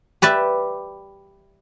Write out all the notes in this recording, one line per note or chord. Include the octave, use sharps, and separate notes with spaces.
G4 B4 D5 E5